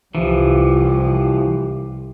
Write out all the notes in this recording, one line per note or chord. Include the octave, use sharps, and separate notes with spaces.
C2 E3 F3 G4